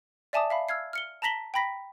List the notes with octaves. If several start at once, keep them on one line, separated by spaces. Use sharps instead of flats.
D5 E5 G#5 A5 D6 D#6
E5 F5 B5
E6 F6 G#6 C7
F6 C#7 G7
A5 A#5 A#6 B6 F#7 G7
G5 A#5 B5 A#6 B6